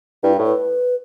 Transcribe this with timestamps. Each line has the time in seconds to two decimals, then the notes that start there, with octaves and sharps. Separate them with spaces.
0.23 G2 E4
0.34 B4
0.39 A2
0.44 B4